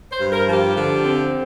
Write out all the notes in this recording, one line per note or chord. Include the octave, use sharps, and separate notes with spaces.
C5
G2
A#4
F3
G4
D3
C4